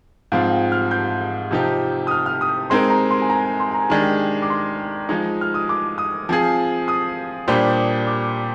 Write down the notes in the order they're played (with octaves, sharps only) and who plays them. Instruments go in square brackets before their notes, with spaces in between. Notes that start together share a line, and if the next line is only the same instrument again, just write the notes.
[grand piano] G#2 F3 C4 F4 [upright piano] F5
[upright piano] F5
G5
F6
G6
[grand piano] C3 F3 C4 D#4 G4
[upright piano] D#6
F6
F6
D#6
[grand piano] G#3 C4 D#4 A#4 [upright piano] C6
[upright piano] A#5
C6
G#5
A#5
G#5
C6
G#5
A#5
[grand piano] D#3 G#3 D4 G4
[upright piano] D6
C6
[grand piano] F3 G#3 D#4
[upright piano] F6
D#6
D6
D#6
[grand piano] F3 C4 F4 G#4
[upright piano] D#6
[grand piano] A#2 G3 D4 G4 C5
[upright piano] D6